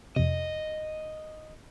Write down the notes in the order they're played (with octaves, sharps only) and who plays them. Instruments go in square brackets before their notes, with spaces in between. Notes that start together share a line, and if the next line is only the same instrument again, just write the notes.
[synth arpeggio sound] F2 C3 [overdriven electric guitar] D#5